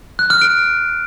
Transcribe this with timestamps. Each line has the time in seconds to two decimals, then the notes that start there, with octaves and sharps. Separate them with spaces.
0.19 F#6
0.30 F6
0.41 D7